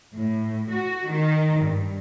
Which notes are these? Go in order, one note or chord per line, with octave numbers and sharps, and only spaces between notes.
A2
F#4
D#3
G2